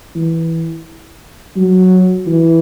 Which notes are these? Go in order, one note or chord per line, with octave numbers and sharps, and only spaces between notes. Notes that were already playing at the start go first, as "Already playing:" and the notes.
E3
F#3
E3